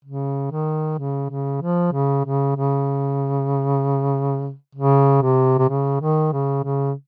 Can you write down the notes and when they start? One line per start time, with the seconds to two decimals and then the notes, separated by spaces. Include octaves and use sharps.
0.05 C#3
0.52 D#3
0.98 C#3
1.30 C#3
1.61 F3
1.93 C#3
2.25 C#3
2.56 C#3
4.75 C#3
5.22 C3
5.58 C3
5.69 C#3
6.01 D#3
6.32 C#3
6.64 C#3